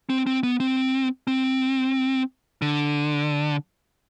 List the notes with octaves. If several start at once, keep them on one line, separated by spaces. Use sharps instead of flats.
C4
C4
B3
C4
C4
D3